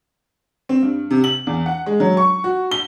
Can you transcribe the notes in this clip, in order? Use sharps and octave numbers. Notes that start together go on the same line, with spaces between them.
C4
G2
C3
F#7
E2
F#5
G#3
F#3
C#6
F#4
G7